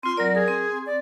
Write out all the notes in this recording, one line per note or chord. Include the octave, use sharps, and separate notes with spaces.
C4 F4 C6
F#3 A#4 D5
G#4 A#4
C4 C6
D5